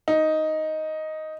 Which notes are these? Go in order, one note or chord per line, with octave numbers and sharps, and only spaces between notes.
D#4